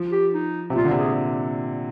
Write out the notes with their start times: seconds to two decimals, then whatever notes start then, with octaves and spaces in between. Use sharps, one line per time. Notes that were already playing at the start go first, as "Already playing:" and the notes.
Already playing: F3
0.12 G4
0.34 D#4
0.70 C3
0.76 A#2 F4
0.85 D3
0.91 C3
0.98 G#4